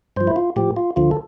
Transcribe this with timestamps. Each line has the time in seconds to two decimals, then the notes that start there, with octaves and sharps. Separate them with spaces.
0.16 G2 F3 C5
0.27 E4
0.36 F4
0.56 A2 F3 G4
0.77 F4
0.96 D2 D3 F3 F4
1.11 A4